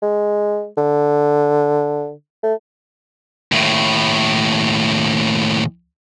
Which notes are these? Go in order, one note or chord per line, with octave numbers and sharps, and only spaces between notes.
G#3
D3
A3
D#2 A2